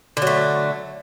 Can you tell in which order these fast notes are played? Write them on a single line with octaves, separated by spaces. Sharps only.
D3 F#3 A3